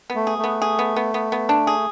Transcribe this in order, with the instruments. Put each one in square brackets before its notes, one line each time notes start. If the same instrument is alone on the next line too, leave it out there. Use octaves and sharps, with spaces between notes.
[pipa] B3
[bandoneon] A3
[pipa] G#4
[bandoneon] A3
[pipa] B3
G#4
B3
B3
B3
B3
D4
G#4